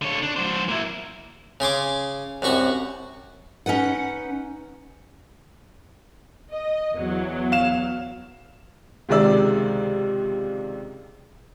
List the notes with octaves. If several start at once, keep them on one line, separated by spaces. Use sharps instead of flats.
D3 C#5
D4
F#3 C5
A#3 E4
C#3 G#4 C6 D6
C2 F#2 F#4 C#6
C#4 D#4 B4 F#5
D#5
E2 F#3
F5 E7
C#2 C3 D#3 G#3 D5 E6